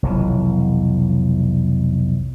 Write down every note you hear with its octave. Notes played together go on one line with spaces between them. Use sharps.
F1 B1 E3